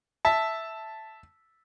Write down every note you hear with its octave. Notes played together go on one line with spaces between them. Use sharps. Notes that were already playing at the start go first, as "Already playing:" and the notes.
E5 A5